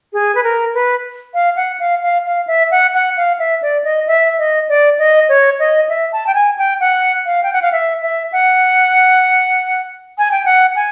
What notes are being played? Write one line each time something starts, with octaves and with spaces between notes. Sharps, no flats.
G#4
B4
A#4
B4
F5
F#5
F5
F5
F5
E5
F#5
F#5
F5
E5
D5
D#5
E5
D#5
D5
D#5
C#5
D#5
E5
A5
G5
G#5
G5
F#5
F5
G5
F#5
F5
E5
E5
F#5
G#5
G5
F#5
G#5